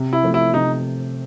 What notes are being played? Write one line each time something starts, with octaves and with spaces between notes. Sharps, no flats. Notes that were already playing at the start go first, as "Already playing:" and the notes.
Already playing: C3
E4
F3 A3
E4
C3 D#4